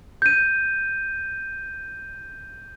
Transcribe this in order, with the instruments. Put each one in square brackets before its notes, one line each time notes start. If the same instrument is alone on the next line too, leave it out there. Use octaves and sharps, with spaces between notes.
[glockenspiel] G6 D#7